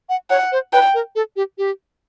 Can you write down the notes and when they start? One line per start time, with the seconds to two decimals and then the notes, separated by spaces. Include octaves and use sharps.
0.09 F#5
0.30 C#5 F#5
0.52 C5
0.73 B4 G5
0.94 A#4
1.15 A4
1.36 G4
1.58 G4